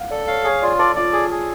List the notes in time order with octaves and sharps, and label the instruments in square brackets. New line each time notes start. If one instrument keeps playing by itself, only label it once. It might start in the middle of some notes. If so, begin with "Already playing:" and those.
Already playing: [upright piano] F5 F#5
[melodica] A4 [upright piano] D5
[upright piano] C#5 [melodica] F5
[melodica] G#4 [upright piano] C#5
[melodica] F4 [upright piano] D5
[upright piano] A4 [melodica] D5
[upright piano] F4 [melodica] D5
[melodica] G#4
G#4